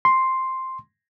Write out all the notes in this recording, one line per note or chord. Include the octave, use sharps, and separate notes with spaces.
C6